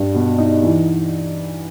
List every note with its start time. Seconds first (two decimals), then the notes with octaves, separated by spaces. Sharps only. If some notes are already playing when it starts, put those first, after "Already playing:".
Already playing: G2
0.14 B2
0.38 D#4
0.63 E3